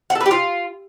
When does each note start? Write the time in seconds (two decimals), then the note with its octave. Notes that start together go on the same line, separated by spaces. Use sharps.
0.10 F#5
0.15 A4
0.20 B4
0.26 G4
0.31 F4